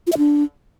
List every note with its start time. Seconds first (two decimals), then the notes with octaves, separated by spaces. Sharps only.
0.07 F4
0.12 E5
0.18 D4